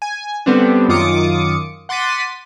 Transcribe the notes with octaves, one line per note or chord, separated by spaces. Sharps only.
G#5
D3 G3 B3 C4 D4
F#2 D#3 F4 D6 D#6 C#7
F#5 C6 D6 A6 B6 D#7